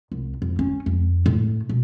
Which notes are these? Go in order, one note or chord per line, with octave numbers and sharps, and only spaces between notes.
C2
F2
C#4
F2
A2
B2